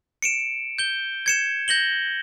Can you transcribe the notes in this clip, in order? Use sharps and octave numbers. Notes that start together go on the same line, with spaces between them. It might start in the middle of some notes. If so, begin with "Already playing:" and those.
C#7 D7 E7
G6 G7
G#6 C#7 E7
G6 A#6 F#7 G7